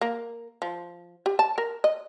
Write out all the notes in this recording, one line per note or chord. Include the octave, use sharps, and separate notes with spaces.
A#3
F3
G4
A5
A#4
D#5